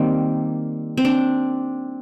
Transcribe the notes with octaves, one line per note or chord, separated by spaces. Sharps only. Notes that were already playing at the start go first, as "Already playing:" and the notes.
Already playing: D#3 G3 A#3 C4
C4
D4